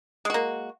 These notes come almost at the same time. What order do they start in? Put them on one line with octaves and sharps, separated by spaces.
G#3 F#4 A#3